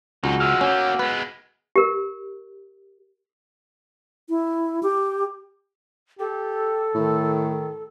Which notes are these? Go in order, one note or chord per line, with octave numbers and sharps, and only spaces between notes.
C#2 F#3 D#4 F#4
F3 G#3 F#5 E6 F6
A#3 C#4 G4
G#3 B3 B4
G4 A#4
E4
G4
G4 A4
A2 D#3